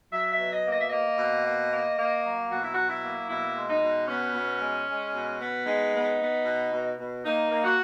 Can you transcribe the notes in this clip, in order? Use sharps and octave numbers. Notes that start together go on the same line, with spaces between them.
F#3 E5
E5
B2
D#5
A#3
D#5
E5
A#3 D#5
B2
A#3
A#3
A#3
F#3
B2 F#4
E4
F#3 F#4
E4
A#3
B2 E4
G#3
D#4
B2
B3 C#4
B2
G#3
G#3
B2
B3
G#3 D#4
B3
B3
B2
B2
B2
A#3 D#4
A#3
F#4